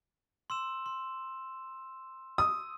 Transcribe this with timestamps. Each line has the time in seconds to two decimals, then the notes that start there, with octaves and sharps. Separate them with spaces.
0.50 C6 E6 E7
0.86 C6
2.38 D#6 E6